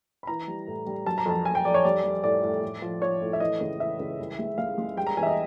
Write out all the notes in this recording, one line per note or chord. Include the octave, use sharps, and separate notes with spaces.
B5
E3 A#5
G3
A2
G3
F#3 A5
A#5
F2 A5
F2 G#5
G5
F2 D5
C#5
G3 D5
G3
A2 D5
A2
A2
F3
F3 C#5
A2
E5
E3 D#5
C#2
E3 E5
C#2
C2
G#3
G#3 F5
G#3
G3 G5
A#5
E2 G#5
E5
D#5